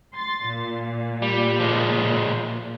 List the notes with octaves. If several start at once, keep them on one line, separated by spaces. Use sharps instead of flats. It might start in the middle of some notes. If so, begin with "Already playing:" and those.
C6 A6
A#2
G3
F3 G#3